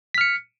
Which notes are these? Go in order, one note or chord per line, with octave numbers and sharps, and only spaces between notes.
F6 B6 C#7